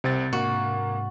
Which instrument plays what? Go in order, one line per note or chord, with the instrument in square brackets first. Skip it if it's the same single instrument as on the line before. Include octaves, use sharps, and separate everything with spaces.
[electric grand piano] C2 C4 A6 [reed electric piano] C3
[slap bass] G#2 D4 [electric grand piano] A#3 [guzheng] F#4